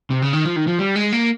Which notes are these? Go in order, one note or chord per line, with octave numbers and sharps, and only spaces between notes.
C3
C#3
D#3
F3
D#3
F3
G3
G#3
A#3